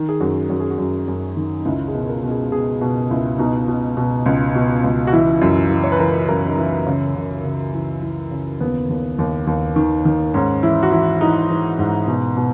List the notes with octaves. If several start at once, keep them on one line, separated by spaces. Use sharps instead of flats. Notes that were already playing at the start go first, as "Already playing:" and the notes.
Already playing: D#3
G#4
F#2 F#4
F#2 F#4
G#4
F#4
F#2
F#2
D#3
D#4
C#2 E4
G#4
B2
A#4
B2
G#4
B2 G#4
B2 F#4
C#2 E4
B2 D#4
B2
B2
C#2
B2
C#2
F#4
E3 E4
F#2
E3
C#5
B4
E3 A#4
F#2 A#4
D#4
E3 E4
C#3
C#3
C#3
E3
E3
C#3
D#2 B3
D#2
D#2
D#2
D#3
D#3
G#2 C#4
E3 E4
F#4
E3 E4
E3 D#4
E3
G#2
B2
B2